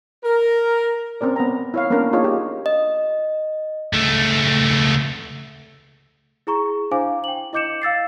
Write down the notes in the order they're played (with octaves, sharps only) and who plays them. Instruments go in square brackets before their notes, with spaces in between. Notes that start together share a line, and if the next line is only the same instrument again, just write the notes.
[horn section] A#4
[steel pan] C4 C#4 A#4 D5
B3 A#5
E4 C#5 F5
A#3 B3 C#4 D4 A#4
D4 D#4 F4 G#4 C#5
G4
[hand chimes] D#5
[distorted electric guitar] C#2 A3
[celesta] E4 G#4 A#5 C#6
D4 E4 C5 F5 G#5 D6
G5 F#7
E4 D#5 D6 G6 C#7 E7
F5 E6 A6 C7